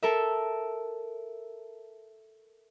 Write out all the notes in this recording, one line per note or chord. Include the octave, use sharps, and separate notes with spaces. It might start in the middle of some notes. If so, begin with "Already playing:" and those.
A4 A#4 E5